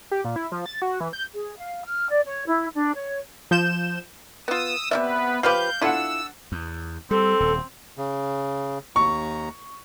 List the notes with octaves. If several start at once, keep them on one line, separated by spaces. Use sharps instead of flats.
G4
A#2
E4
F3
A6
F#4
E3
G6
G#4
F5
F6
D5
C#5
E4
D4
C#5
F3 G6 E7
B3 F4 D#6 E6
C3 B3 C#4 B4 D5 E5
F3 G4 B4 F5 D6 G6
D4 E4 F4 A4 F#5 E6
E2
G3 C4 A4
D#1
C#3
D#2 A#5 C#6